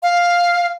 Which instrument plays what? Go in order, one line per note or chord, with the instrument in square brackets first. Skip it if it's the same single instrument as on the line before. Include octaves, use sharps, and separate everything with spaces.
[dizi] F5